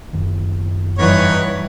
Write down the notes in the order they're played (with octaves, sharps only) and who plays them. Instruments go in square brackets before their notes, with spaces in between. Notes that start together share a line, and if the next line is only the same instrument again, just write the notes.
[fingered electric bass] F#1 F#2 D#3
[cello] G2 E3 [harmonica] D#4 C#5 F#5